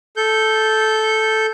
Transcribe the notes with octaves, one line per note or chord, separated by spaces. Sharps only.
A4 G6